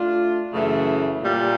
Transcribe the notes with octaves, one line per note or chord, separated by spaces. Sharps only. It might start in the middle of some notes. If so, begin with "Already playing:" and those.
Already playing: A3 D4 F4
F#2 C#3 E3 A3
A#2 G3